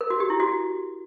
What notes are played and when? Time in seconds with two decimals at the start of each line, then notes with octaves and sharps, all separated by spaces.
0.01 A#4
0.10 F#4
0.20 G4
0.30 E4
0.40 F#4